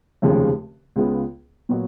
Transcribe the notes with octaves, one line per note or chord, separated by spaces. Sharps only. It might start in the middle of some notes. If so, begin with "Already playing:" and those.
F1 D#2 C#3 F3 G#3
C#2 C#3 G#3 B3 F4
A#2 F#3 B3 F#4 C#5